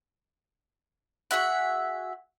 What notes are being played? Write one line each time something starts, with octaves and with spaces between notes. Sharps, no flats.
F#4 G#4 E5 F#5